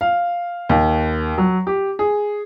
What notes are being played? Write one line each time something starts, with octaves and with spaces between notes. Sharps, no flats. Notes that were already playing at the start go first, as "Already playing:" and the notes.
F5
D#2
F#3
G4
G#4